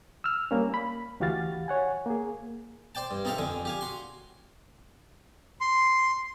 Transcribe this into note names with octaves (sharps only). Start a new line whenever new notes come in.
E6 F6
G3 A#3 C#4
B5
D2 E3 F#4 G4 F5 A6
C#5 F#5 G#5
A#3 G#4
C5 D5 G5 A5
G2
C4 D#4 A4 E5 F5 G5
F2 D3 G#5
G4 F5 G#5
F#4 C6
C6